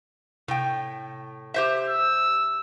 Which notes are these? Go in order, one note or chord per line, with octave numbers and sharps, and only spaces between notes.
A2 C3 G5
G4 C5 E5
E6